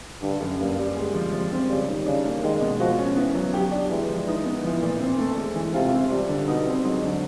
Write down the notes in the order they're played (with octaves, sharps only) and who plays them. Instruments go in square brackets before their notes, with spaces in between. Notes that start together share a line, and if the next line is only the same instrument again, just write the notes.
[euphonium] G2 [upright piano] D3
[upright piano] F#2
[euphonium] G2 [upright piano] A#3
[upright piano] G3
G#3
F3
[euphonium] C3 [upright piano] F3
[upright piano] C4
[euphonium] C#3 [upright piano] G3
[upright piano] D#3
[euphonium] C#3 [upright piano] D4
[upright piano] A#3
[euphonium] D#3 [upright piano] G#3
[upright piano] B2
[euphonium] F3 [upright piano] F#4
[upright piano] C#4
[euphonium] E3 [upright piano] B3
[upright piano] F#3
G4
D4
[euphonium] E3 [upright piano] G#3
[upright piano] F3
[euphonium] E3 [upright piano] D#4
[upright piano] B3
[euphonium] E3 [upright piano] F3
[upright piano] A#2
C4
A3
G#3
E3
[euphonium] C3 [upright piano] F4
[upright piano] C4
G3
D3
[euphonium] B2 [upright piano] D#4
[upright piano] C4
[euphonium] G#2 [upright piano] F#3
[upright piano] D3